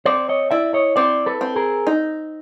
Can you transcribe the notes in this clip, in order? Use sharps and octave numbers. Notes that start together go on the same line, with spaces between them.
C4 C5 D5
C#5 D#5
E4 D5 E5
C#5 D#5
C4 C5 D5
A4 B4
C4
G#4 A#4
D#4